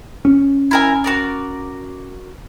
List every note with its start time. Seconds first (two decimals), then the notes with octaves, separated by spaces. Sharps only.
0.25 C#4
0.71 E4 A#4 G#5
1.04 F#4 A#4 D5